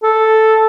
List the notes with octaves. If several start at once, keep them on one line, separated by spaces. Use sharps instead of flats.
A4